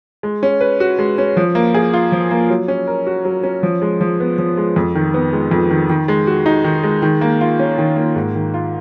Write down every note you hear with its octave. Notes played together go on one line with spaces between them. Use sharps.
G#3
C#4
B4
F#4
G#3
C#4
F3
A#3
G#4
F4
F3
A#3
F#3
C#4
A#4
F#4
F#3
C#4
F3
G#3
F3
B3
F3
G#3
F2
D#3
B3
G#3
F2
D#3
D#3
G#3
F#4
D#4
D#3
G#3
D#3
A#3
F4
C#4
D#3
A#3
G#2
D#3
F4